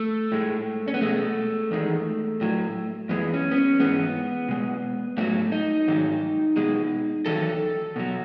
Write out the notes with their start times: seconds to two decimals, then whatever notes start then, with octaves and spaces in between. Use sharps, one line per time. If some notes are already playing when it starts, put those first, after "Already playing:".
Already playing: A3
0.32 A2 G#3
0.88 C#4
0.94 B3
1.01 B2 G#3 A3
1.71 E2 D#3 G#3
2.41 A2 F#3
3.09 F#2 E3 G#3 B3
3.34 C#4
3.51 B3
3.56 C#4
3.80 G#2 E3 G#3 B3
4.48 B2 G#3
5.17 G#2 F#3 A3
5.52 D#4
5.88 G#2 D#3 F#3
6.56 B2 G#3
7.26 E2 D#3 F#3 A4
7.96 B2 F#3